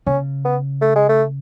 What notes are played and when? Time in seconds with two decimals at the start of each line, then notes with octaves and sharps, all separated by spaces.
0.06 C#3 C#4
0.45 B3
0.81 A3
0.95 G#3
1.09 A3